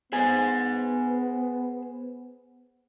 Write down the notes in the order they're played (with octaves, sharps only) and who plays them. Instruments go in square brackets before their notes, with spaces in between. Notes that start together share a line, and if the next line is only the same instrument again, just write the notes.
[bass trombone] B3 [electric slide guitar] G#4 C5 G#5